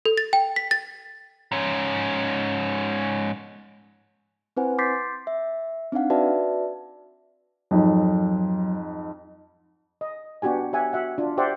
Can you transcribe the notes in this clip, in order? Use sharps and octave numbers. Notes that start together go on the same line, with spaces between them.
A4
A6
G5
B6
A6
G#2 C#4
C4 E4 B4 C5 F#5 G#5
C6 D6 G6 A6 B6 C7
E5
C4 D4 D#4 F5 F#5
F#4 B4 D5 E5 A5
F2 G#2 F#3
D#5
B3 D4 F#4 G4 G#5
G4 C#5 E5 F#5 G#5
F#4 E5 F#5
D4 F4
G4 C5 D5 E5 F#5 G5